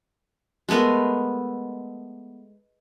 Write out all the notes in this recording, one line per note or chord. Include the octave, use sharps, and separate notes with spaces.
G#3 A3 B3 A#4